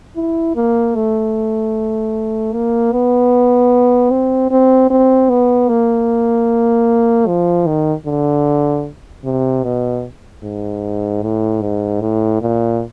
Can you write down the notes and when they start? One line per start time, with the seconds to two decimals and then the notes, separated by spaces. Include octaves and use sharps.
0.16 E4
0.56 A#3
0.95 A3
2.53 A#3
2.93 B3
4.11 C4
4.51 C4
4.90 C4
5.29 B3
5.69 A#3
7.27 F3
7.67 D#3
8.06 D3
9.24 C3
9.64 B2
10.43 G#2
11.22 A2
11.62 G#2
12.01 A2
12.41 A#2